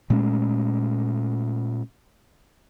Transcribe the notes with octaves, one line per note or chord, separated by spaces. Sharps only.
A#2 G#3 A3 C#4